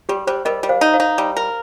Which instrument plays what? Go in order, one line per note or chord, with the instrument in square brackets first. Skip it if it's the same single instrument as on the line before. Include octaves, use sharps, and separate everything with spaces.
[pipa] G3 [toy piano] G4
[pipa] G3 [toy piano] C5
[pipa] G3 [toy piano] A#4 D#5
[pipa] G3
[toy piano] C5 F5
[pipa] D#4
[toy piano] C5 F5
[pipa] D#4
G3
A#4